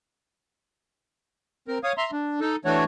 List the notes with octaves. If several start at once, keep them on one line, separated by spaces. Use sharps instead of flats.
C4 A#4
C#5 F5 D#6
E5 A#5 C6
D4
D#4 A4
E3 A3 D4 F#4 C#5